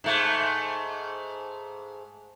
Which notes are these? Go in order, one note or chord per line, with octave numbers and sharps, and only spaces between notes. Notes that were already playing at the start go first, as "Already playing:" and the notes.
G#2 A3